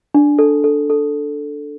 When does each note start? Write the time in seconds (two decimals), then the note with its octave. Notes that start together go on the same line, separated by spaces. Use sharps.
0.14 D4
0.38 A4
0.64 A4
0.90 A4